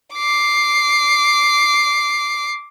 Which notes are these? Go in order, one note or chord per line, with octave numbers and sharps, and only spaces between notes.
D6 C7